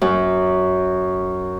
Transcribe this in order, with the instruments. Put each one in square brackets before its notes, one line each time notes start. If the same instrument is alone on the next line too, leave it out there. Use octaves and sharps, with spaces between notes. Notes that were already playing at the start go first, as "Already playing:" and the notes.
[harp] F#2